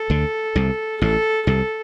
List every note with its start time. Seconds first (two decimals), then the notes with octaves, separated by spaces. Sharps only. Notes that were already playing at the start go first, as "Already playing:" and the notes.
Already playing: A4
0.10 D2 D3
0.56 C2 C3
1.01 A1 A2 A4
1.47 C2 C3 A4